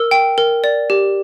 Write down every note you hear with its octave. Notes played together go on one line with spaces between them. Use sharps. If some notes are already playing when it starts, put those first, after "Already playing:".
Already playing: A#4 E6
G5
A#4
D5
G4